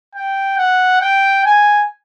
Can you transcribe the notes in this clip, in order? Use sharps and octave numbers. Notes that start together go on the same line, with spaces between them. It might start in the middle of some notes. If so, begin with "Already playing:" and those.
G5
F#5
G5
G#5